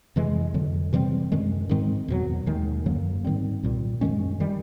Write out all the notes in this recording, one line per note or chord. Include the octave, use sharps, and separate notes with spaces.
F2 C3 E3 G#3
F2 D3 F#3
C3 E3 G3 C4
F#2 D#3 G#3
G#2 D#3 G#3 C4
E2 B2 F#3
D#2 D#3 G#3
F#2 D3 F#3 A#3
G#2 D#3 G3 C4
C2 A#2 G3
F#2 D#3 G#3 C#4
D#3 G3